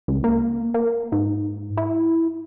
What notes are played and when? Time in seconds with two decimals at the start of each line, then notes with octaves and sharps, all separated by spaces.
0.08 C#2
0.24 A#3
0.74 A#3
1.12 G#2
1.77 E4